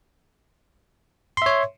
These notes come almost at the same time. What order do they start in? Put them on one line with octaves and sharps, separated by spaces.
C6 E5 C#5